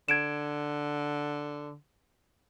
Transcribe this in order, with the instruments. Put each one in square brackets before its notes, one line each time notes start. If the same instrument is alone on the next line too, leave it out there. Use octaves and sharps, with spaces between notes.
[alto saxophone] D3 [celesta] G#6 D7 E7